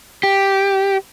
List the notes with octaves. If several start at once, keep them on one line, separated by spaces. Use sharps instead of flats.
G4